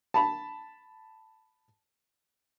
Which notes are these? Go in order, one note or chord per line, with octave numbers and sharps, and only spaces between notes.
A5 B5